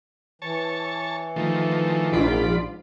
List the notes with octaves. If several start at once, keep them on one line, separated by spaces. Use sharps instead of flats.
E3 C#5 A5
D#3 F3 A3
A#1 G#2 F4 D5 B5